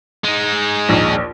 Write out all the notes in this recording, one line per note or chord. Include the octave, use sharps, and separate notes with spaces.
G#3 D#4
A#1 D#2